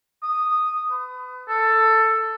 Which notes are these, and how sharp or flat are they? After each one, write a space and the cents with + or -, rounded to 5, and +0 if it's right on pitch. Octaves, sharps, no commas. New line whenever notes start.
D#6 -5
B4 +35
A4 +10